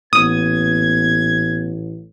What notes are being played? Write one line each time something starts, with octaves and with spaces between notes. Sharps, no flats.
A1 A#2 B3 D#6 G#6